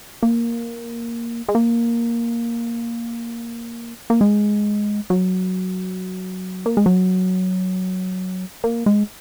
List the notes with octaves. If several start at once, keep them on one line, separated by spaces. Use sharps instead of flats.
A#3
G#3
A#3
A#3
G#3
F#3
A#3
G#3
F#3
A#3
G#3